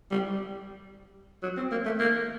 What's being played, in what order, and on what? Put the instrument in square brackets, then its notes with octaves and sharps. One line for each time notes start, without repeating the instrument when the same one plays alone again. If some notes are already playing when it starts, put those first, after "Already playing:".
[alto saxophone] G3
F#3
C4
A#3
A3
A#3